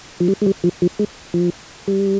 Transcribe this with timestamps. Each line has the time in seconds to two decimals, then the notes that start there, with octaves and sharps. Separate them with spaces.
0.20 F3
0.28 G3
0.42 G#3
0.46 G3
0.64 F3
0.82 F3
0.99 G#3
1.34 F3
1.88 G3